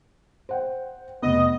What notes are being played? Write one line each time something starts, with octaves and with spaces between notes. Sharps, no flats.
C5 F#5 G5
F1 B3 D#5